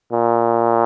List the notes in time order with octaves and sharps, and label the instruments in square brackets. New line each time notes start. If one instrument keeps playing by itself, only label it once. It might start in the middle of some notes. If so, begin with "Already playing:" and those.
[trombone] A#2